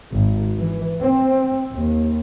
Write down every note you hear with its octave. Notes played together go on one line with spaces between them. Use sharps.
G#1
E3
C4
D#2